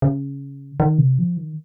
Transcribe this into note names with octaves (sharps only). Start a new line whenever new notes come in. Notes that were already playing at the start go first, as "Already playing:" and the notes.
C#3
D#3
C3
F3
D#3